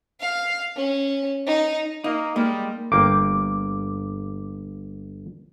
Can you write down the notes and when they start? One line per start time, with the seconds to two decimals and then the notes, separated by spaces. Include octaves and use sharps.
0.20 F5
0.76 C#4
1.46 D#4
2.04 A#3 D#4
2.36 G3 G#3 A#3 D#4 A#4
2.92 G1 A#3 G5 D6